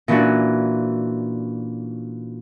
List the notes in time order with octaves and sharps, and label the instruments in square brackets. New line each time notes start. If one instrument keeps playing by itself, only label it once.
[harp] A#2 E3 C#4 D4 F#4